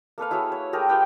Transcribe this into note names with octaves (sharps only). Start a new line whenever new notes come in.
A#3 A4 B4 F5
E4 F#4 G#4 C#5
C#5
A3 G4 G#4 A#4
F4 G4 B4 G5